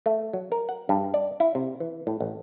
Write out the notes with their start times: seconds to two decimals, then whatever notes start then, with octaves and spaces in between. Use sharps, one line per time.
0.06 A3
0.33 F#3
0.52 A#4
0.69 F#5
0.89 G2
1.14 D5
1.40 E4
1.55 C3
1.80 E3
2.07 A2
2.20 A1